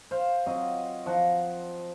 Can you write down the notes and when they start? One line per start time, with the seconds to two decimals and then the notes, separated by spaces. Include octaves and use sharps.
0.11 C5 F5
0.46 F#3 C4 F4 D#5
1.06 F3 F#5 A#5